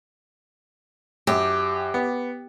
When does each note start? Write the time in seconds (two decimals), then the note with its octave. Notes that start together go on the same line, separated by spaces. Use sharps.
1.27 F#2 G4
1.94 B3